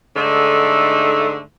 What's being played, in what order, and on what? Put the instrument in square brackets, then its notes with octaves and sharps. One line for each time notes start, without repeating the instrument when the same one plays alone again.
[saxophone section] G#2 D3 A3 D#4